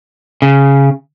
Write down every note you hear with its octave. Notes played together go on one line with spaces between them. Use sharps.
C#3